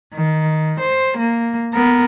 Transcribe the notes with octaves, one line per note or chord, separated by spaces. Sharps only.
D#3
C5
A#3
B3 A#4